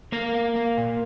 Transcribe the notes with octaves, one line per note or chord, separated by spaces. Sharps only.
A#3 A#4
A#3
A#3
A#2